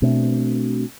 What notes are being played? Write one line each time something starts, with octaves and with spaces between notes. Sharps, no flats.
B2 A3 C4 D4